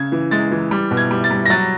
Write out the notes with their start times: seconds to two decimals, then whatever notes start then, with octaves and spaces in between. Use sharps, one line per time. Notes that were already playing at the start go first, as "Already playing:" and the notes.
Already playing: C#3 G#6
0.12 E3
0.31 G#3 A6
0.51 E3
0.71 G3
0.91 B2
0.97 G#6
1.11 G3
1.24 A6
1.31 G3
1.45 A#6
1.50 F#3 A6